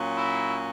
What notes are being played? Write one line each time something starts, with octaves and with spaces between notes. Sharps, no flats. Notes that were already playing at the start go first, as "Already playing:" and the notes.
Already playing: A#2 F#3 C#4
E4